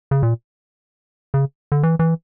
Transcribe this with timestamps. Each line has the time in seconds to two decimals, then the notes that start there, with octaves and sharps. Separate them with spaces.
0.11 C#3
0.23 A#2
1.34 C#3
1.72 D3
1.83 E3
1.99 E3